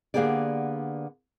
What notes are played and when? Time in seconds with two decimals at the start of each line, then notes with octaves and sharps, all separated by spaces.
0.14 D3 A#3 B3 G4 G#4 D5